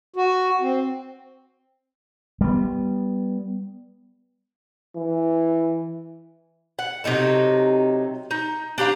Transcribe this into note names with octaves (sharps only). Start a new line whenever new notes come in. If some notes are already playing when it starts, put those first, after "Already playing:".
F#4
C4
G3 B3
E3
F#5
C3 F#3 D#4 A4
D#4
D4 G4 F5 A#5